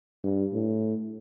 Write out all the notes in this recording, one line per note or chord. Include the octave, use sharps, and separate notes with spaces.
G2
A2